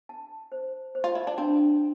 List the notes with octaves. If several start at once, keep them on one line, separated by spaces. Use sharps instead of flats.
A5
C5
C5
F4
E4
D4
C4 D4